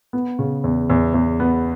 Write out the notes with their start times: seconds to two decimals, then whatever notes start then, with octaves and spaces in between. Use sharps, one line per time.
0.13 B3
0.39 C#3
0.64 E2
0.90 E2
1.14 E2
1.40 B3